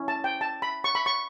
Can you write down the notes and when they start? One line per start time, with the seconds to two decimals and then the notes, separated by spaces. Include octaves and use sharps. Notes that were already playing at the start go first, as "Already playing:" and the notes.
Already playing: C#4 E4
0.08 A5
0.24 G5
0.41 A5
0.62 B5
0.84 C#6
0.95 B5
1.06 C#6